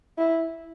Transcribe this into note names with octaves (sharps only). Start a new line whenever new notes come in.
E4